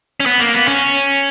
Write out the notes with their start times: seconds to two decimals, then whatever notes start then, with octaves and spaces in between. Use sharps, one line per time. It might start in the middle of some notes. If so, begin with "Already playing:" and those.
0.20 C#4
0.26 B3
0.40 A#3
0.54 B3
0.68 C#4